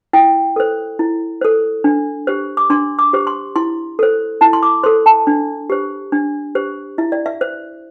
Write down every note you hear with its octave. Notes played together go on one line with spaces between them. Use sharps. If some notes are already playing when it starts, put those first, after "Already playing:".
E4 G5
A4 C5
E4
A4 C5
D4
G4 C5
D6
D4 C6
D6
G4 C5
C6
E4 C6
A4 C5
E4 A5
C6
D6
A4 C5 C6
A5
D4
G4 C5
D4
G4 C5
E4 E5
D5
E5
C5